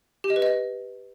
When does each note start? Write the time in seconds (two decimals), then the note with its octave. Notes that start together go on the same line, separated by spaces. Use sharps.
0.24 G4
0.30 D#5
0.36 B4
0.42 D#5